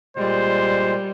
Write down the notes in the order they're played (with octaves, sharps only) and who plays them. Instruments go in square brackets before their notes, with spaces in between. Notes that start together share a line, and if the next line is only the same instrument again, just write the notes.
[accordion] A#2 G#3 [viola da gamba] G3 [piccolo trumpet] C5